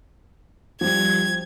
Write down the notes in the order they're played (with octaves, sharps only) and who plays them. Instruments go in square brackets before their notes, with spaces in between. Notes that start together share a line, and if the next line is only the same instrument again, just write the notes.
[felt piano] F3 G3 [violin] G#6